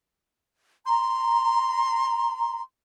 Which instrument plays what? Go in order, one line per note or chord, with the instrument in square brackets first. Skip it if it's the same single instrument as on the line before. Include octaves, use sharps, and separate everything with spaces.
[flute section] A#5 [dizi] C6